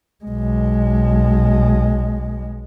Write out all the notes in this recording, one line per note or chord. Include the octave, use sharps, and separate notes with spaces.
B1 G#3